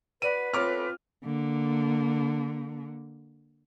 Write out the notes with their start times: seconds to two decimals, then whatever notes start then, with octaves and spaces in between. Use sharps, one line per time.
0.22 F#4 B4 D5 F#5 D#7
0.54 E3 A3 C4 F4 A4 C#5 D6 F6
1.24 D3 A#3